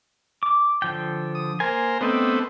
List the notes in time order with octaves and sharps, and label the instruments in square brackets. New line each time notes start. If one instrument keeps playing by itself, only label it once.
[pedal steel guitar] D6
D3 F3 G5
[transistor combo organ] D#6
[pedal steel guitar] A#3 G#5 [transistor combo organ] A#4 C5
[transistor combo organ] A3 B3 C4 [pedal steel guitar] D4 D#5 G5